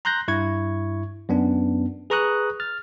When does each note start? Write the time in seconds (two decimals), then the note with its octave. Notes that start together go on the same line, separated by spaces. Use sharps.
0.05 A#5 C6 F#6 G6 A#6
0.28 G2 E4 C#6 G#6
1.29 F#2 B3 D4
2.10 G#4 B4 A#5 C#6 D#6 F#6
2.60 F6 A6